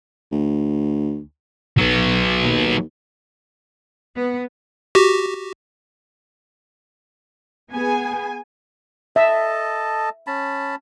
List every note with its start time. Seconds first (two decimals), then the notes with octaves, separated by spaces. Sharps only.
0.32 D2
1.78 B1 F#3 B3
2.43 D#2
4.16 B3
4.95 F#4 G4
7.73 B3 G#4 G#5
9.16 A4 D#5 E5 A5
10.27 C#4 A5 B5